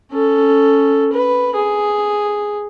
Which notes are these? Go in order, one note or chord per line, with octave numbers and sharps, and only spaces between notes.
C#4 A4
B4
G#4